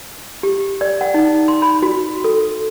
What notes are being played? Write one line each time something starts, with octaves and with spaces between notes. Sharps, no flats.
G4
D5
F#5
D#4
C6
B5
F#4
A4